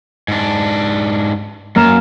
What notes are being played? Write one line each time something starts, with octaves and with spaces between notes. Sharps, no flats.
G#2 D4
F#2 A#3 F6 E7